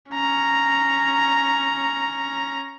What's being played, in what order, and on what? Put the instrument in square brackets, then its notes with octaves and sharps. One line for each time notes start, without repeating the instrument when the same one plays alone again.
[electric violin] C#4 A#5